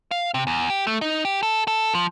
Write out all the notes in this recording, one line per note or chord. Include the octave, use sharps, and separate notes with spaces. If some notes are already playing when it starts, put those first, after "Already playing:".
F5
C3
E2
G4
A3
D#4
G4
A4
A4
F3